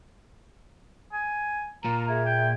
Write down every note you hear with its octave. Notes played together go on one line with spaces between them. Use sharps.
G#5
A#2 A#4 A#5
G#4 E5 G#6
G5